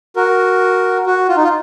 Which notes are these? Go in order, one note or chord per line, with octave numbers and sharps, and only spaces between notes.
F#4 A#4
F#4
F4
D#4
F4